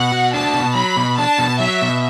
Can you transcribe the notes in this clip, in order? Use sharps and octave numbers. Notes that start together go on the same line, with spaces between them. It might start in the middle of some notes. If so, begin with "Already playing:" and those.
Already playing: B2 F#5
F#4
D4 A5
B2
F#3 B5
B2
D4 A5
B2
F#3 E5
B2